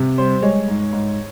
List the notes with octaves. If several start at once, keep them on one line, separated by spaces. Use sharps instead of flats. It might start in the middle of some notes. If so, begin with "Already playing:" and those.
Already playing: C3
G3 C5
G#3 C#5
G#2
G#2